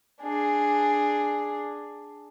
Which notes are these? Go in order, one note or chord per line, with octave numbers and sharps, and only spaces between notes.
D4 G#4